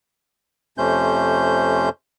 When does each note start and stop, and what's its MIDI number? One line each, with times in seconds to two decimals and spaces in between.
0.78 1.89 41
0.78 1.89 48
0.78 1.89 57
0.78 1.89 61
0.78 1.89 72
0.78 1.89 91